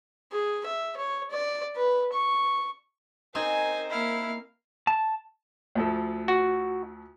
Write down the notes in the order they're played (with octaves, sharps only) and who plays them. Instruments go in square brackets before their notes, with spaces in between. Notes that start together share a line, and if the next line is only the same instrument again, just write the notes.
[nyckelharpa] G#4
E5
C#5
D5
B4
C#6
[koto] C4 D#4 G#4 [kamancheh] A#4 C5 [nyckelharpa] G#5
[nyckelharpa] A#3 F5 [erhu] E4
[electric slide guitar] A5
[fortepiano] D2 F3 A4
[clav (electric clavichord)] F#4